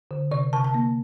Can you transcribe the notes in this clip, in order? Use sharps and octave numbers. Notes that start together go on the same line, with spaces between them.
D3
C3 D5
C3 A5
A5
A#3